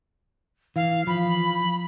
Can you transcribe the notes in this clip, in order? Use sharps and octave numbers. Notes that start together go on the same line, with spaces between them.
E3 F5
F3 B5